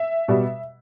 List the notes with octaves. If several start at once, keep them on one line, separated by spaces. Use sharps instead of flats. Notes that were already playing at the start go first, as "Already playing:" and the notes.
Already playing: E5
B2 G3